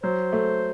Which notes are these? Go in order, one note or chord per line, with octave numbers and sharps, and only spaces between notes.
F#3 C5
A3